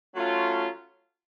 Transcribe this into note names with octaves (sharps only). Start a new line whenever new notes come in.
F#3 A3 C#4 F4